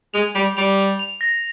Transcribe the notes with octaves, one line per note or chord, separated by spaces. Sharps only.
G#3 F7
G3 F7
G3 F7
F7
F7
A#6